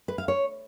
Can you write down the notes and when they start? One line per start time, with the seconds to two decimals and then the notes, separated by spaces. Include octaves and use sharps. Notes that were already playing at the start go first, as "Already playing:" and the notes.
0.08 B4
0.18 F5
0.28 C#5